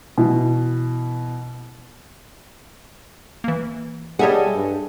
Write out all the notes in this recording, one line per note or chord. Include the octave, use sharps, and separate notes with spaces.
B2 E3
E3 A#3
G3 G#4 A4 C#5 D#5 E5 F#5
G2